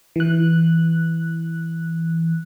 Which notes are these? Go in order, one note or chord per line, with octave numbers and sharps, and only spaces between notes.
E3 F#6